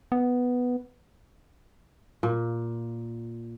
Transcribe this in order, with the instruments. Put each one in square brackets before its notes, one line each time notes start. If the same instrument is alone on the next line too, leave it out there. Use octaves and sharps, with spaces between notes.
[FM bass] B3
[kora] A#2